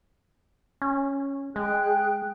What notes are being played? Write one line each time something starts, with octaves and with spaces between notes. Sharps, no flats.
C#4
G#3 G#4 G5 F#6